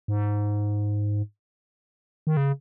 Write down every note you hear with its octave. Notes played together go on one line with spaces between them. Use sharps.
G#2
D#3
C#3